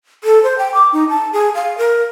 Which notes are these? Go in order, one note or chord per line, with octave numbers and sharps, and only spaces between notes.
A4
C5
G5
D6
D#4
A5
G#4
F5
A#4